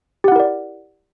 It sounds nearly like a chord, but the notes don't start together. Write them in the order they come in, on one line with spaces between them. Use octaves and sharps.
G4 F#5 E4 A#4 D5